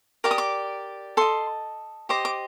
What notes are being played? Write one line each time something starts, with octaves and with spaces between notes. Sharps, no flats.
G4 A#4 D5 D6
D#6
D6
A4 D#5 C6
G4 C5 D#5 D6
D6